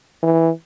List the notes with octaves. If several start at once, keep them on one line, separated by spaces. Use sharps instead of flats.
E3